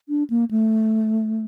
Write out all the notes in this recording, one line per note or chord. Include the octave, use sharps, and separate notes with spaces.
D4
A#3
A3